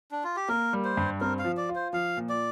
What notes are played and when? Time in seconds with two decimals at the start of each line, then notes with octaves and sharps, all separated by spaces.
0.11 D4
0.24 F4
0.36 G4
0.48 A#3 A#4
0.73 G3
0.85 C5
0.97 G2
1.21 C4 A#4
1.39 F5
1.45 F3
1.57 D5
1.69 F4
1.75 C5
1.93 F3 F5
2.17 A#2
2.29 D5